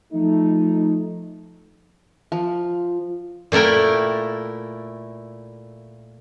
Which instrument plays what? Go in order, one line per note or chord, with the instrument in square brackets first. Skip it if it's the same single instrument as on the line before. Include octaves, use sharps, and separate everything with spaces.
[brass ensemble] F3 A3 D#4
[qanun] F3
[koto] A#2 A3 E4 A#4 G5